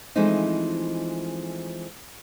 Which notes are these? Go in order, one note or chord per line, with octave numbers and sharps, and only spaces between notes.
E3 F3 G#3 A3 C4 D#4